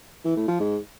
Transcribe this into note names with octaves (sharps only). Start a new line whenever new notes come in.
E3
A2
F3
G#2